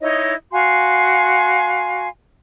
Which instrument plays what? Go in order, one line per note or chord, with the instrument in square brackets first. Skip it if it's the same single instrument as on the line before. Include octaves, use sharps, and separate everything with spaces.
[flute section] D#4 E4 C#5 D#5
F#4 F5 G#5 C6